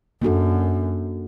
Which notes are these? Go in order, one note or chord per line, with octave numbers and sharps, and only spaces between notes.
F#2 A#3 D4 F#4 A4